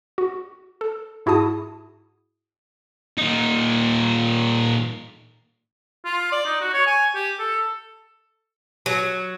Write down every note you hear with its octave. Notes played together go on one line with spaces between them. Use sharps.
F#4
A4
G#2 E4 F#4 G#4 A5 D#6
A#2 D#4
F4
D5
D#4
F#4
C#5
G#5
G4
A4
F#3